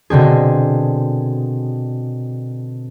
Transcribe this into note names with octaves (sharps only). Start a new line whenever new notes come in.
B2 D3 C4 G#4